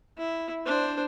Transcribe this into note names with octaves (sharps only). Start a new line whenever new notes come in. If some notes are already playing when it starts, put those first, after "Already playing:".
E4
D4 C5